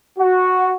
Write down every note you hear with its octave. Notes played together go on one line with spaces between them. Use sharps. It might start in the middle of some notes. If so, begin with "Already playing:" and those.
F#4